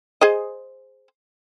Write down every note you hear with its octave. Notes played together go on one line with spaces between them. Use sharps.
G#4 C5 D#5